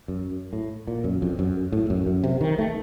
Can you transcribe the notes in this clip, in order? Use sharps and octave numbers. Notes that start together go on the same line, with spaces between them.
F#2
A2
A#2
F#2
F2
F#2
A2
F#2
F#2
C3
D#3
A3